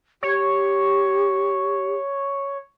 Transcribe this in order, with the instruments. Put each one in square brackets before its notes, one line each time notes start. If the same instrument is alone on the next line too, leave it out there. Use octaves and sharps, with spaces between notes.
[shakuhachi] G4 [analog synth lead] C#5